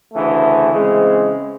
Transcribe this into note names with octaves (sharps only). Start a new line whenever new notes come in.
D2 C#3 E3 A3
C#3 E3 G#3 C4